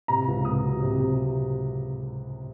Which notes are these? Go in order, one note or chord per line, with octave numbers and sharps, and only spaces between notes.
C3 A#5
C#2
C3 D#6
F#3
C3
C3